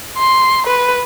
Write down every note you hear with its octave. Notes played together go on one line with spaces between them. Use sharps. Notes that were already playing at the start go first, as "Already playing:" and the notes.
C6
B4